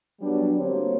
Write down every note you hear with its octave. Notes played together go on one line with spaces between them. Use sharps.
F#3 G3 B3 D4
D2 G3 A#3 C4 G4 C#5